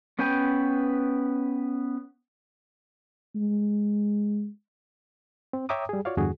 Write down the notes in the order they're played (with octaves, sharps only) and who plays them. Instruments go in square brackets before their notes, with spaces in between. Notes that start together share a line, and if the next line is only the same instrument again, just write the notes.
[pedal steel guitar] B3 C#4 B4 G5 G#5
[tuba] G#3
[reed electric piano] C4
C#5 E5 G5 A#5 D6 D#6
G3 G#4
F4 F#4 C#5 D5 F5
E2 G2 D3 F#4 G#4